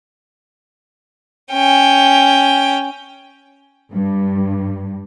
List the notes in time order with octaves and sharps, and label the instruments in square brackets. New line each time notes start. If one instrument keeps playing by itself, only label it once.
[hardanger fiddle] C#4 G5
[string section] G2